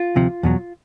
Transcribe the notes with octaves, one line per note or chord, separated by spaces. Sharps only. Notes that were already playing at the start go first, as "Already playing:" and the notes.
Already playing: F4
D2 C3 F3
E2 B2 F#3